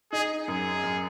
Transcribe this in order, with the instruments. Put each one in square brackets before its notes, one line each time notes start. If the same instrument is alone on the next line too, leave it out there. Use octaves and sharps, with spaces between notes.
[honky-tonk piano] D#4 [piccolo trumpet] G#4
[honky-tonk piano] F#2 [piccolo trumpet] G#4
[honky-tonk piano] F#2